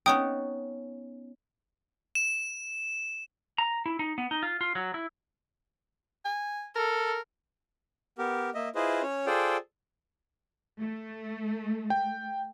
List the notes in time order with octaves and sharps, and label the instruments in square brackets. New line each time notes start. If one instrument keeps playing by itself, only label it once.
[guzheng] B3 C#4 D#4 [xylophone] G5 D#6
[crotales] E7
[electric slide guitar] A#5
E4
D#4
B3
D#4
F4
F4
F#3
E4
[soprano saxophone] G#5
[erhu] A4 [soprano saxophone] A#4
[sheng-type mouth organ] B3 G4 A#4
A#3 D#5 E5
E4 F4 G#4 B4 C5 D#5
C#4 C#5
F4 G#4 A4 C5 D5 G5
[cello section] A3
[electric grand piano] G5